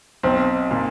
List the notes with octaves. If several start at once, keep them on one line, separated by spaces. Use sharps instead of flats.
B1 C4
A#2